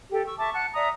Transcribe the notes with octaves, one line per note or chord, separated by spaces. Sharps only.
G4 A4
C#6 E6
E5 A5 C#6 D6
F#5 A5 F#6
D5 E5 A#5 D#6